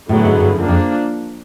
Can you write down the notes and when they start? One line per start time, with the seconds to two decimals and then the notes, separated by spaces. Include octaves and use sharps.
0.09 A2 D3 F#3 B3 E4 G#4
0.25 G#2
0.40 G2
0.56 F#2 F3 A#3 D4
0.68 F2